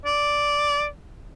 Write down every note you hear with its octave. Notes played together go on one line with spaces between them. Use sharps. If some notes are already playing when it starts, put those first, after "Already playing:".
D5